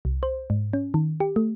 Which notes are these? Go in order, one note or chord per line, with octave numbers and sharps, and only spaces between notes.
C2
C5
G#2
C#4
D#3
G4
A3